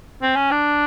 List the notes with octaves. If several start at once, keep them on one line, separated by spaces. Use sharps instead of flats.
C4
C#4
D4